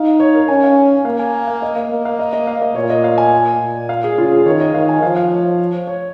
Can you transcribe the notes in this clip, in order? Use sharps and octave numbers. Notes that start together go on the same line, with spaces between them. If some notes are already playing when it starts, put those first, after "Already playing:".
Already playing: D#4 F5
C#5
A#4
C#4 G#5
F5
A#3 F5
G#5
F5
D#5
F5
A#3
F5
D#5
D#5
F5
D#5
A#2 C#5
D#5
F5
G#5
A#2
F5
G#4
C#3 F4
G#4
D#3 C#5
D#5
D#3 F5
G#5
F3 F5
F5
C#5
C#5